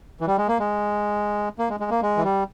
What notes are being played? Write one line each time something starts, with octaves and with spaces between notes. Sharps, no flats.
E3
G3
G#3
A#3
G#3
A#3
G#3
G#3
A#3
G#3
E3
G3